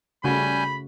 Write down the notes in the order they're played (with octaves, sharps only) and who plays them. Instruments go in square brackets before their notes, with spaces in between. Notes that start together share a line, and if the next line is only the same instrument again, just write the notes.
[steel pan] C#3 A3 F#4 [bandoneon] G3 G#5 G6 [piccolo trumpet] B5